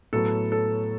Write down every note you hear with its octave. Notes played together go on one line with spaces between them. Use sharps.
A2 F#3 B3 A4
A4